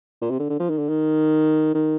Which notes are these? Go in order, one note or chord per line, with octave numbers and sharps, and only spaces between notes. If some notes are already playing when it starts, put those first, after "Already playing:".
A#2
C3
D3
D3
F3
D#3
D3
D#3
D#3